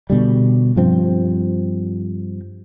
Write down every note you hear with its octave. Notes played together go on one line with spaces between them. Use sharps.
B2 D3 G3
G2 F3 C4